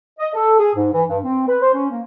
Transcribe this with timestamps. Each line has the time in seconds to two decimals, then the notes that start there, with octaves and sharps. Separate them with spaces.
0.19 D#5
0.34 A4
0.60 G#4
0.75 G#2
0.92 E3
1.09 G2
1.24 C4
1.47 B4
1.62 C5
1.74 C#4
1.91 A#3